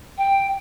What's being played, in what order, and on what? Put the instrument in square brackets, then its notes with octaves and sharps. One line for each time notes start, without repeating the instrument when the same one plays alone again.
[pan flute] G5